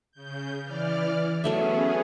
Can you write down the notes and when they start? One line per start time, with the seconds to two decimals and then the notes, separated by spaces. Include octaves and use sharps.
0.12 C#3 G6
0.63 E3 D5 F6
1.44 F#3 A3 B3 C#4 G#4 E5